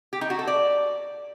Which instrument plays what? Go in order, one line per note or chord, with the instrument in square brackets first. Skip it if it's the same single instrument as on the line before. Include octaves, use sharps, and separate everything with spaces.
[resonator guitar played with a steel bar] G4
D#4
F#4
A4
D5